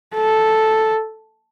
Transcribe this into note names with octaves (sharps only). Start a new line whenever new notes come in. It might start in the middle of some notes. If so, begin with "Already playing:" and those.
A4